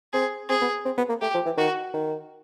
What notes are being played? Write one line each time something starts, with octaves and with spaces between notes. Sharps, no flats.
C4 G#4
C4 G#4
B3
C4
B3
A#3
A3 G4
F3
E3
D#3 F#4
D#3